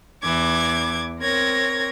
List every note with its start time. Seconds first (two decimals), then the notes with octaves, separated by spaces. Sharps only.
0.23 E2 E3 D6 G#6
1.21 C4 A#4 C#5 G#6 A#6